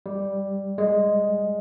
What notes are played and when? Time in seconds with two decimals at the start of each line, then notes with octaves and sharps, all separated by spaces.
0.06 G3
0.78 G#3